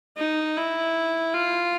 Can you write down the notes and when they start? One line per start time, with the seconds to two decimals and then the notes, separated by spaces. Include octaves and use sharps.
0.17 D#4
0.56 E4
1.33 F4